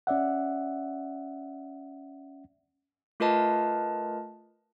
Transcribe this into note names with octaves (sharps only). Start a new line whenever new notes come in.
C#4 D5 E5 F#5
A3 F4 A#4 B4 D#5 A5